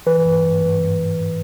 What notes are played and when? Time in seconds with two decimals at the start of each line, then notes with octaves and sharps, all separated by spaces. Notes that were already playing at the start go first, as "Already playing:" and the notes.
0.06 E3 B4
0.25 G2
0.44 G2
0.62 G2
0.81 G2